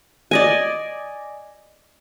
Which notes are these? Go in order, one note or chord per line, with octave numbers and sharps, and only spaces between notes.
D5 D#5 G#5